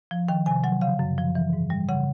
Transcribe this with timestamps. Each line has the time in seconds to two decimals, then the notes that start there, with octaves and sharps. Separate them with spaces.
0.11 F3
0.29 D#3 G5
0.46 C3 G#5
0.64 F#3 F#5
0.81 C#3 F5
0.99 F#2
1.18 F3
1.35 E3
1.53 G#2
1.70 G3
1.89 C#3 F#5